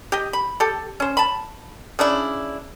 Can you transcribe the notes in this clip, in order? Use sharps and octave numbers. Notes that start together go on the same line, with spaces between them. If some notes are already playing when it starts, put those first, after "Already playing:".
G4 D#5
B5
G4 A4
C#4 C5
A5 B5
C#3 D4 E4